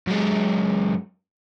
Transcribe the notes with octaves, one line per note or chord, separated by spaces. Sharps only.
F#2 G#3